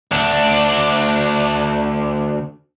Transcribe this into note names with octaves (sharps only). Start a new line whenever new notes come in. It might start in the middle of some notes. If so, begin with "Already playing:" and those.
D2 D4